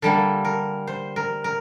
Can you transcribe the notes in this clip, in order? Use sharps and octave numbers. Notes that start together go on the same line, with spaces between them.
D3 G3 A#3 A4
A#4
C5
A#4
A#4